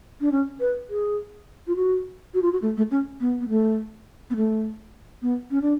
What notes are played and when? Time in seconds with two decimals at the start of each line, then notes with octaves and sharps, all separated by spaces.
0.21 D4
0.32 C#4
0.60 B4
0.89 G#4
1.67 F4
1.76 F#4
2.34 F#4
2.42 F4
2.52 F#4
2.62 A3
2.77 A3
2.91 C#4
3.20 B3
3.41 B3
3.49 A3
4.30 B3
4.36 A3
5.22 B3
5.51 C#4
5.61 D4